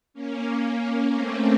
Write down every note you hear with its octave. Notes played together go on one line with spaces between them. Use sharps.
A#3 C#4
A#3
A#3
A3 C4